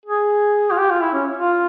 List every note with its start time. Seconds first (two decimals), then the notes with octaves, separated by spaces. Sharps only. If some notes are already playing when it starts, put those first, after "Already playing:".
0.06 G#4
0.71 F4
0.78 G4
0.90 F4
1.02 E4
1.13 C#4
1.37 F4